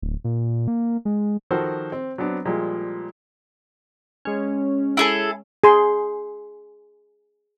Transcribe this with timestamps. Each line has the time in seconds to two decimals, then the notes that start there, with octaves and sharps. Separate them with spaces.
0.02 D1
0.24 A#2
0.68 A#3
1.05 G#3
1.51 D#3 F3 F#4 A4 A#4 C5
1.92 C4
2.18 F#3 B3 C4 D4
2.45 A#2 F3 G3 G#3
4.25 G#3 C#4
4.97 E4 G#4 A4
5.64 G#4 C6